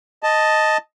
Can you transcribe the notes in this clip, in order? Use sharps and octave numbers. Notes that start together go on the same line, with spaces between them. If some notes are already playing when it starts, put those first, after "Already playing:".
D#5 A5